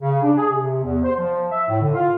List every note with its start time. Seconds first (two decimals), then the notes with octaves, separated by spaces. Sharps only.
0.01 C#3
0.22 D4
0.37 G#4
0.52 C3
0.82 E2
1.04 C5
1.18 F3
1.50 E5
1.68 A2
1.80 D3
1.93 F4